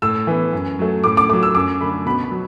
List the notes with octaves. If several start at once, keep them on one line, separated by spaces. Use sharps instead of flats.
A2 E6
E3 B3
F#2
F#3 A3
A2 D6
D6
F#3 A3 D6
E6
F#2 D6
D3 A3 B5
B2 B5
B5
F#3